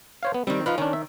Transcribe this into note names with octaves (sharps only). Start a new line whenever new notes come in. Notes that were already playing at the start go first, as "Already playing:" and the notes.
C5 C#5 F5
B3
D#3 G3 C4
F3 D#4 F4 B4
D#3 C#4 D4
E5